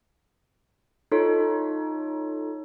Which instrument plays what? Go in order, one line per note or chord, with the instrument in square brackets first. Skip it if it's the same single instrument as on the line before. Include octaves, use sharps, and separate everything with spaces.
[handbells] D#4 F4 A4 C#5